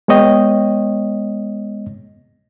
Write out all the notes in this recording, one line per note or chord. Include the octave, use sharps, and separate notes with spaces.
G#3 B3 C#5 D#5 G5